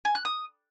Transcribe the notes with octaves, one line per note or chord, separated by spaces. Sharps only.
G#5
F#6
D#6